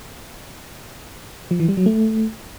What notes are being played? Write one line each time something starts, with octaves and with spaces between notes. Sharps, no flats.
F3
E3
G3
F#3
A3